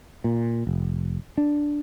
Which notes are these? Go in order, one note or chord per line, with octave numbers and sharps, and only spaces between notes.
A#2
F1
D4